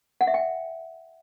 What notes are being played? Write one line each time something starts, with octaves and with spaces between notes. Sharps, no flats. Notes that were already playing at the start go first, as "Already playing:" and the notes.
F#5
E5
G5